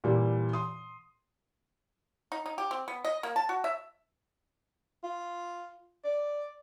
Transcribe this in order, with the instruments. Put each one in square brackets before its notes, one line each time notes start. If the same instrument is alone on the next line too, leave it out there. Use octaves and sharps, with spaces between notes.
[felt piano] A#2 E3 G3
C6 D#6
[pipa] D#4
D#4
G4
C4
B3
D#5
A#3
A5
F#4
E5
[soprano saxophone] F4
D5